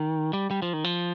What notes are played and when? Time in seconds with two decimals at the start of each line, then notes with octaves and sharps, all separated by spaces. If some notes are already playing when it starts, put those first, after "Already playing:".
Already playing: D#3
0.33 G3
0.51 G3
0.62 F3
0.73 D#3
0.84 F3